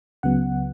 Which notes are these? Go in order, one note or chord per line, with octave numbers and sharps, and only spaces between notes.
C#2 C#3 F#3 B3 F#5